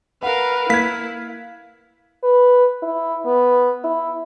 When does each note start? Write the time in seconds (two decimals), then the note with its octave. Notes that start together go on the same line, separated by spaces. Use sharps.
0.23 A#4 B4 F5 F#5
0.69 A#3 E4 F5 G#6 B6
2.23 B4
2.82 E4
3.26 B3
3.84 E4